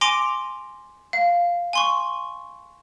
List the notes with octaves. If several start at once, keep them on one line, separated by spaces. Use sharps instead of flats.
G#5 C6 D6 A#6 D7 F7
F5
G#5 C6 C#6